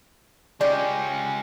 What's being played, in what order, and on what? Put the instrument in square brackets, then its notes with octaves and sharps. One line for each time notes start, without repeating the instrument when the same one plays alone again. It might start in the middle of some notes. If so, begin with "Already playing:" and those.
[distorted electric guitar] G#3 C#4 [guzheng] G4 [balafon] D5